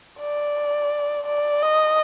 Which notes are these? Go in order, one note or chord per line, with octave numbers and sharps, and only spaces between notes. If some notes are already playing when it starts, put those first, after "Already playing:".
D5
D5
D#5